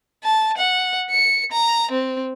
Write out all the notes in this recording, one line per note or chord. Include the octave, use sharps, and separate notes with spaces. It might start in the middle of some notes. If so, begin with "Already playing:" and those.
A5
F#5
C#7
A#5
C4